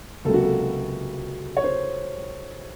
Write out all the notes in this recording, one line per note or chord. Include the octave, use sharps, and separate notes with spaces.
C#2 C3 F#3 A#3 A4
F#4
A4
C#5
C5